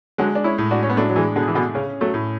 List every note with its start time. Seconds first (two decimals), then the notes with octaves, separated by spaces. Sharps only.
0.18 D3 F#3 G#3
0.35 D4
0.44 C#4 E4
0.58 A2
0.71 D4 F#4
0.83 C#4
0.90 B3
0.97 F#3 A3 D4
1.09 F#3
1.16 E3 G#3
1.36 B2 D3 G#4
1.48 E3
1.55 B2 D3
1.75 C#3 C#4
2.01 F#3 A3
2.14 A2